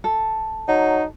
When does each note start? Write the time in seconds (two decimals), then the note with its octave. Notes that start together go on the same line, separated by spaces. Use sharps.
0.04 A4
0.68 F#3 D#4